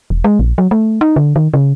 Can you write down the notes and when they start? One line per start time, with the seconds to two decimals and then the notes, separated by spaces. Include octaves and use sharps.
0.10 E1
0.24 G#3
0.39 A#1
0.58 F#3
0.71 A3
1.01 D#4
1.16 D3
1.36 D#3
1.54 C#3